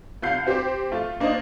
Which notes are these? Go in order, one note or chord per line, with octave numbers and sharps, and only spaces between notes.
C2 F4 F5 G6 C7
C4 G4 C5 D6
A3 F4
A#3 D4 D#4 C5 D#5